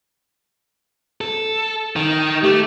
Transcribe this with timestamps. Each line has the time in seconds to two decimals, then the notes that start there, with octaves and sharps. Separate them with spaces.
1.21 A4
1.96 D#3
2.44 A3 G4